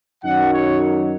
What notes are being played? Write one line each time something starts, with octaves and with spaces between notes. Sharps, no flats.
F#2 D#3 F#3 D#4 F#5
C#5